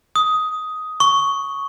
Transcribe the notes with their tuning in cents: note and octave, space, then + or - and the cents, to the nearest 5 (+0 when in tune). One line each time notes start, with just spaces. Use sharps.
D#6 +10
C#6 +5